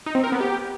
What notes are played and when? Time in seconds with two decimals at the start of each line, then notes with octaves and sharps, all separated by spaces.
0.06 D#4
0.15 C4
0.24 A#4
0.32 B3
0.41 G4